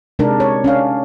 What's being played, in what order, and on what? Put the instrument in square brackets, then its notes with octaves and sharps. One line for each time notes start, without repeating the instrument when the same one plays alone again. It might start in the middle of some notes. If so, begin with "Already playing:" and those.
[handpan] C3 G#3 D4 D#4 A#4
C#5
C#4 D4 F5